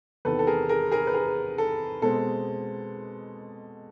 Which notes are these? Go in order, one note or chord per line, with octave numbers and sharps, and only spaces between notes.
E2 C3 D#3 A4 B4
A4
G#4 A#4
G#4 A#4
G#4 A#4
B4
G#4 A#4
A4
B2 G#3 C4 A4